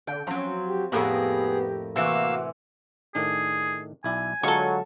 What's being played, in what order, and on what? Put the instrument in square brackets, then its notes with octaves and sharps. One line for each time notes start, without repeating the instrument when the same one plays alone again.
[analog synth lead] D3 [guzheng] G5
[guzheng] F3 C4 [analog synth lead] F#3 [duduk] C#4
[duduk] G4
[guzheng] F2 A2 A#3 [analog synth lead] B3 [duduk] G4 [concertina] G#4
[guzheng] C3 E3 [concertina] A#3 F5 E6 [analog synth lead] F#4
[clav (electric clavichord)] A2 D#3 D4 [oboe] G#4
[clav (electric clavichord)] B1 E4 D5 [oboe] G#5
[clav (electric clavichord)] D3 G#3 F4 [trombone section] F#3 [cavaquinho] A4 C#6